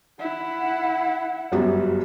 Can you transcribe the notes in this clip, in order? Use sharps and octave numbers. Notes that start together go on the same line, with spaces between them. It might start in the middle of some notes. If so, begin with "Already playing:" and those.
E4 F#5
G1 F#2 G3